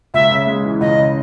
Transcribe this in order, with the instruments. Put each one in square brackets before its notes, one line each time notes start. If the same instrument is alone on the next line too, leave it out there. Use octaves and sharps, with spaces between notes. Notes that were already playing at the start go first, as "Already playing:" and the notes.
[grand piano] C#2 [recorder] E5
[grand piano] C#3
G#3
E3
[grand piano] C#2 [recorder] D#5
[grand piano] C#3